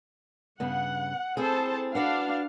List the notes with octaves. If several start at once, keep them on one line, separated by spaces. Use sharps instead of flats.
G2 C#3 B3 F#5
C4 E4 G#4 A4 C5 A5
D4 F#4 B4 F5 F#5